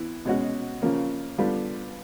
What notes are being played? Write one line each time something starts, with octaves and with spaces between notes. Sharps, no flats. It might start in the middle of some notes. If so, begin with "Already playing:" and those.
Already playing: E3 B3 E4
B2 G#3 C#4 F#4
C#3 F3 A#3 C#4
D3 G3 B3 D4 F4